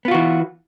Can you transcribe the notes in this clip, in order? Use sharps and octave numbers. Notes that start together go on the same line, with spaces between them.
E3 B3 F4 F#4